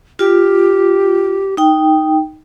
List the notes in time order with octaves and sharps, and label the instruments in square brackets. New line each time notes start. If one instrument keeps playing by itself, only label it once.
[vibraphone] F4 [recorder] G4
[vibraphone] D#4 G5